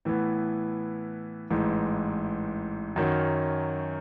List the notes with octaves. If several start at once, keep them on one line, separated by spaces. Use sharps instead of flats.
A2 E3 B3
A1 G#2 E3
F#2 D#3 F#3 C#4